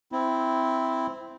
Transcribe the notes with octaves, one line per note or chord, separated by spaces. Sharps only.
C4 E4